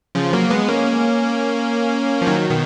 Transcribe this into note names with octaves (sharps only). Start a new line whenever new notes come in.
C#3 F3
F#3 A#3
G#3 B3
A#3 C#4
F3
D#3 F#3
B2 D#3